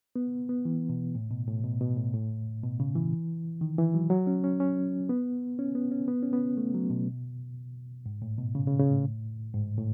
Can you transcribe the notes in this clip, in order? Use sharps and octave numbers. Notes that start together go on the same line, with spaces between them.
B3
B3
E3
B2
A2
B2
A2
B2
B2
A2
A2
B2
C#3
E3
D#3
E3
F#3
F#3
C#4
C#4
C#4
B3
C#4
B3
C#4
B3
C#4
B3
A3
F#3
B2
G#2
A2
B2
C#3
C#3
C#3
A2
G#2
A2